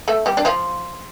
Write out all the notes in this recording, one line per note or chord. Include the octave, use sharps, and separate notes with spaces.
A3 A4
G3 G4
D4
F3 F4